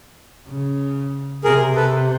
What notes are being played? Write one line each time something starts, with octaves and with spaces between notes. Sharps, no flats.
C#3
C3 G#4 A#4
A4 B4